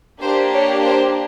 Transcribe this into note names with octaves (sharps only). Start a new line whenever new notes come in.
A#3 D4 G4 C5
C#5
C5